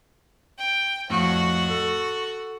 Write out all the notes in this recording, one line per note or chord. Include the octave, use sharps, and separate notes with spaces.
G5
F2 A2 F#4
A4